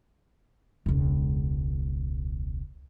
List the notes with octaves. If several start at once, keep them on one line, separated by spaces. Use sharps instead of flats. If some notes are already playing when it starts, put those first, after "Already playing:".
E1 C#2